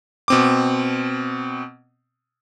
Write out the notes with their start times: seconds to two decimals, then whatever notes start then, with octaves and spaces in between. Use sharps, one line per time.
0.28 B2 C4 D6